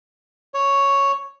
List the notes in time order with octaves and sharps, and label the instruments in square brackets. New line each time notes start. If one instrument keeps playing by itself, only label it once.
[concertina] C#5